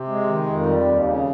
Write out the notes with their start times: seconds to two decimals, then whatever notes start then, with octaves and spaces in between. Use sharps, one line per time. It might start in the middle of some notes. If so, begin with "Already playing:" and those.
Already playing: C3
0.08 G#3
0.27 D#3
0.46 F2
0.66 G3
0.85 D#2
1.05 C#3